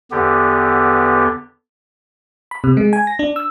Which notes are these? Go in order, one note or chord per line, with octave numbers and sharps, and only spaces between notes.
E2 D3 B3 G4
B5
C3
G#3
G#5
A#6
D4
E6